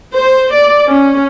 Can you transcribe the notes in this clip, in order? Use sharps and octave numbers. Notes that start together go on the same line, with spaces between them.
C5
D5
C#4